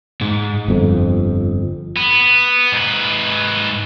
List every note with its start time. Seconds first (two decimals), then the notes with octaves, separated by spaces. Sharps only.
0.21 G#2
0.68 G1 F2
1.97 B3
2.73 G#2 B4